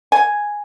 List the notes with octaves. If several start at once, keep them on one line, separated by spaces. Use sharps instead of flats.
G#5